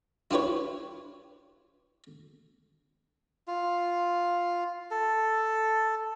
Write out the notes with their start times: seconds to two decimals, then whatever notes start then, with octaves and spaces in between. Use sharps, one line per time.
0.31 E4 F4 G4 B4 C#5
3.48 F4
4.91 A4